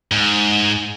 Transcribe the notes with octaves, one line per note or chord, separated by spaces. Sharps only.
G#2